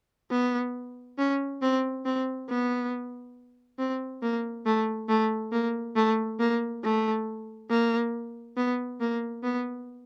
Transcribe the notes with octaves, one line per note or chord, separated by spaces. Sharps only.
B3
C#4
C4
C4
B3
C4
A#3
A3
A3
A#3
A3
A#3
A3
A#3
B3
A#3
B3